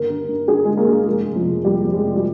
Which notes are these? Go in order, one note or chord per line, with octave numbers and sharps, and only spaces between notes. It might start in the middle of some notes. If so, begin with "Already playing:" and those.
Already playing: G1 D#2 A#4
D3
G2
G2 G#4
D3 G#3
A#3
G2
F1 G#3
F1
F3
F1
F2 G3
F2
G#3
F1
G3